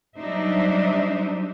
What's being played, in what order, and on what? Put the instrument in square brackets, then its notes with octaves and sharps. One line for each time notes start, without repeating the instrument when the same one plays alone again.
[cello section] F#3 G3 D4 D#4 C5 E5